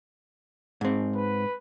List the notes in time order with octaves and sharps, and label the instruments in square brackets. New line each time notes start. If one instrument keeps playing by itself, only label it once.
[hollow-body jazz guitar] G#2 C4
[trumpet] B4